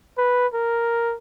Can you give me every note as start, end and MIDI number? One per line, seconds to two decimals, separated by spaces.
0.18 0.47 71
0.54 1.16 70